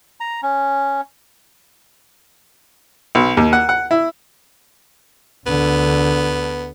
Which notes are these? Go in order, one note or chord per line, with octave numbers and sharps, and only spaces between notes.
A#5
C#4
B1
D#2
F#5
F#5
E4
D2 D3 B3